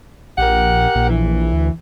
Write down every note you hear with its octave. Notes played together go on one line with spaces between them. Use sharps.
A#1 G4 A#4 F#5
A#1
E3
D2